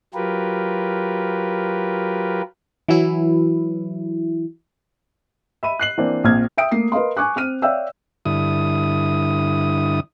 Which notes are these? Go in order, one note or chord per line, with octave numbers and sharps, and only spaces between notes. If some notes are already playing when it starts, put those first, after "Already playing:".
F#3 F4 G4 A#4 B4
E3 F#3 E4
E5 B5 D#7
F#6 C7 F#7
E3 A#3 C4 D4
A#1 A#2 C4 F6 G#6
E5 G5 D#6 D7
A3 A#3 C7
A#4 B4 D#5 F5 C6
G#5 C#6 D6 F#6
C4 F6 D#7
C#5 D5 E5 F5 G5 E6
G2 D3 E4 D#6